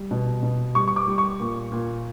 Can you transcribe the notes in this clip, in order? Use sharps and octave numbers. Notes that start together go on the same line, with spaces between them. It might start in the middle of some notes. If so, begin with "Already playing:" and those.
Already playing: G3
B2
B2
G3 C#6
C#6
D6
G3
C#6
A#2
A#2